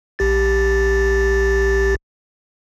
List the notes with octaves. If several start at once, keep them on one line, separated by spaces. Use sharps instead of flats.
A#1 G4 A6